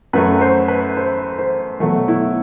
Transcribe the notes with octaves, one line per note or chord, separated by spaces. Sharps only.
F#2 F#3 A3 B4
C5
B4
C5
C5
B2 F#3 A3
E4